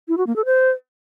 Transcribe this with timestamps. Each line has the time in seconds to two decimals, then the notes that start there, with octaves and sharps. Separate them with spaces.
0.08 E4
0.17 F#4
0.27 A#3
0.36 A4
0.45 C5